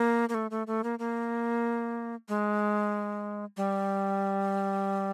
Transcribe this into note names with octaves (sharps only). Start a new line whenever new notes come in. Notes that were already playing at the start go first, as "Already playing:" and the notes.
Already playing: A#3
A#3
A3
A3
A3
A#3
A#3
G#3
G3